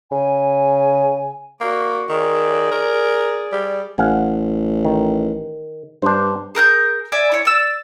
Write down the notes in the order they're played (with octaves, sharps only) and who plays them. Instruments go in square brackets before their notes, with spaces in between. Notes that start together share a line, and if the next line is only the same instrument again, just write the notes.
[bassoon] C#3 [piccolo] G#5
[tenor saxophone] A#3 [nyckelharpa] F#4 D5
[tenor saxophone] D#3 [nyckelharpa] G#4 D5
[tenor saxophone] A#4
G3
[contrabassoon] A1 [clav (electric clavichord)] F5 F#5 G#5
[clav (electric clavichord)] D#3
[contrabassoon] G2 [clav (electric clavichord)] D4 C5
[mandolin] G#4 A#4 F#6 G6
D5 E5 G#5
E4 C#5
D5 E6